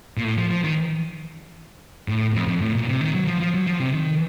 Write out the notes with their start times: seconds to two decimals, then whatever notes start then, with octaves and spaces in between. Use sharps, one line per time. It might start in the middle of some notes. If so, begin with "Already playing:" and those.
0.17 A#2
0.24 A2
0.37 F3
0.51 F3
0.64 D#3
2.08 A2
2.35 F2
2.48 F2
2.62 A2
2.75 A#2
2.88 C3
3.01 D#3
3.14 F#3
3.27 F3
3.41 F3
3.54 F#3
3.67 F3
3.80 C3
3.94 D#3